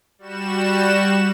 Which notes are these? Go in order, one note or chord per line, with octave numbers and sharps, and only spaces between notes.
G3 F#4 E7